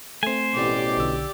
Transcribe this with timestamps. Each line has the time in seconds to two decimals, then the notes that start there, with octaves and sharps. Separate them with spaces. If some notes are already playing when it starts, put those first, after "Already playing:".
0.23 A3 C4 C5 G#5
0.54 A1 B2 G4 D5
0.97 B1 D3 E6